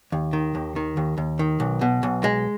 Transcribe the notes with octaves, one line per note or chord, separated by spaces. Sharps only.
D#2
D#3
D#2
D#3
D#2
D#2
D#3
B1
B2
B1
G#3